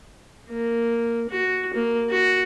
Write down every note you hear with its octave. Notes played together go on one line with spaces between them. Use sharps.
A#3
F#4
A#3
F#4